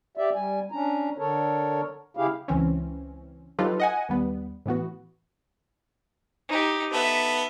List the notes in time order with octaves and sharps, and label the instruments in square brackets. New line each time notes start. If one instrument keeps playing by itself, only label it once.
[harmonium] G4 D5 E5
G3 G#5
C#4 D4 A#5
D3 A4 A#4 C#5
C#3 E4 G4 G#4 F5
[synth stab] C#2 E3 C4 C#4
F#3 D#4 F4 G4 A4 B4
D#5 F#5 G#5
D#2 G3 B3
A2 E3 B3 F#4
[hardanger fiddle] D#4 G4
[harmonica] B3 A4 [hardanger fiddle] E5